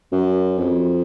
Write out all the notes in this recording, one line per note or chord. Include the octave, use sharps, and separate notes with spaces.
F#2
F2